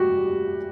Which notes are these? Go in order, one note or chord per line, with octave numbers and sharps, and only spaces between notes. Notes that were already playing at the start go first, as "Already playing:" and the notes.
Already playing: G3 F#4 G4